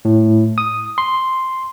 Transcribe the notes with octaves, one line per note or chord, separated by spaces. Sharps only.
A2
D#6
C6